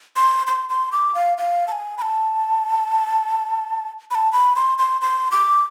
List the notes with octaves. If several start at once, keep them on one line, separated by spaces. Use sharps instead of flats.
C6
C6
C6
D6
F5
F5
A5
G#5
B5
A5
B5
A5
B5
C6
C6
C6
D6